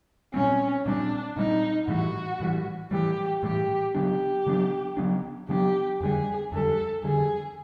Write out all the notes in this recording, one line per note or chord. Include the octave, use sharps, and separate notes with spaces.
A#2 G3 C4 C#4
A#2 G3 C4 D4
A#2 G3 C4 D#4
A2 E3 G3 F#4
A2 E3 G3
A2 E3 G3 G4
A2 E3 G3 G4
C#3 F#3 B3 D4 G4
C#3 F#3 B3 D4
C#3 F#3 B3 D4
C#3 F#3 B3 D4 G4
F2 D3 G3 G#4
F2 D3 G3 A4
F2 D3 G3 G#4